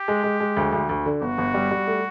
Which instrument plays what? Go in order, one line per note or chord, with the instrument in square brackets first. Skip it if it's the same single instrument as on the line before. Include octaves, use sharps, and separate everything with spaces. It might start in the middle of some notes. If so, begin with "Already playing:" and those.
Already playing: [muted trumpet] G4
[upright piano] G#3
G#3
G#3
D2
D2
D2
D3
[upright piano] G1 [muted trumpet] F#4
[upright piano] G1
G3
G3
A3